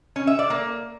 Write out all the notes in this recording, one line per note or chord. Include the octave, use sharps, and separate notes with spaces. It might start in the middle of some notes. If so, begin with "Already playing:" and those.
C#4
E5
D5
A#3